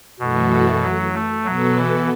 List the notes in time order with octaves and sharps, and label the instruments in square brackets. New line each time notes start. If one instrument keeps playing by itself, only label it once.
[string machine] F#2 E3 A3 F#4 A4 [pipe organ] B2
[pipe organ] F#3
A3
[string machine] B2 B3 F#4 A4 [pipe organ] F#3
[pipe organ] E3